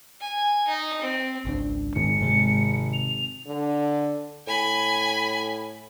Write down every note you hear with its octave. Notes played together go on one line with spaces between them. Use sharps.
G#5
D#4
C4
G#1 C#2 D4
G#1 G#2 D#3 C#7
G#2 C3 G#3
F7
D3
A2 G#5 B5